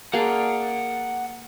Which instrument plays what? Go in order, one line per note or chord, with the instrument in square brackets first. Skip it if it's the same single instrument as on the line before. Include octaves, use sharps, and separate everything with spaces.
[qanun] A#3 G#4 [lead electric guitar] F#5 A5